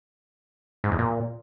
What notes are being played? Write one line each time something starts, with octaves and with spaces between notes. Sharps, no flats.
G#2
E2
A#2